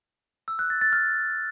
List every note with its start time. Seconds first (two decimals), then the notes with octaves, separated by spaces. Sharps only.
0.48 E6
0.59 F#6
0.70 A6
0.81 A6
0.93 F6